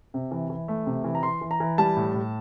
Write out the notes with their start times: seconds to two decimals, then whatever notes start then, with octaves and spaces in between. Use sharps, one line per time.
0.14 C3
0.31 E3
0.50 E3
0.68 A3
0.86 C3
1.04 E3
1.15 A#5
1.23 E3 C6
1.41 E3
1.51 A#5
1.60 E3
1.78 G3 A5
1.96 A2
2.14 A2